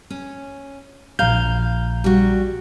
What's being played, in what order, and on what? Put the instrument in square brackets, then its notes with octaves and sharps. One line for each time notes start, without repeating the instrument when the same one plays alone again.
[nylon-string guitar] C#4
[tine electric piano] A#1 A#5 G6 [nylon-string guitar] F5
[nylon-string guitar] G3 F#4